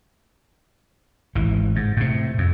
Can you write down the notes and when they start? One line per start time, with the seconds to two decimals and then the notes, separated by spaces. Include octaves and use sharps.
1.35 G#1 E3
1.76 G#2
1.97 A2 C3
2.38 F2